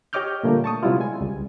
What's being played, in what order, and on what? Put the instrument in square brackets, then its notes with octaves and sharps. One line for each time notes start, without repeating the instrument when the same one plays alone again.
[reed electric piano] G4 C#5 D#5 D6 F6 G6
A#2 D3 G3 A3 A#3
A5 C#6 D#6
C3 F#3 G3 B3 E4 F4
G#3 G#5
C#2 G3